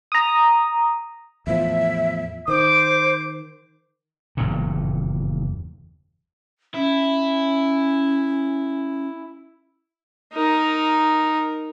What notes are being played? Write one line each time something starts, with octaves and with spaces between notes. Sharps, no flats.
A#5 D#6
E2 A2 F3 E5
D#3 C5 D6
F#1 E2 G2 A#2
C#4 E4
D#4 A#4